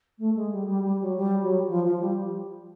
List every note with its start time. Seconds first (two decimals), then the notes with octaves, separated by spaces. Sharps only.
0.19 A3
0.35 G#3
0.52 G3
0.68 G3
0.85 G3
1.01 F#3
1.18 G3
1.43 F#3
1.68 F3
1.84 F3
2.01 G3